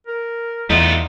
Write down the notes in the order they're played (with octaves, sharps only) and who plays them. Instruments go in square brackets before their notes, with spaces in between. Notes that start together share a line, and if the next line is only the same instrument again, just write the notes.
[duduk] A#4
[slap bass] E2 [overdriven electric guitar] A3 F4 [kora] D#4 D5 F#5